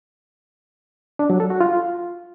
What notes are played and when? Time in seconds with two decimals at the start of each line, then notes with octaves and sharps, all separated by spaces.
1.19 D4
1.30 F#3
1.40 A4
1.50 F#4
1.61 F4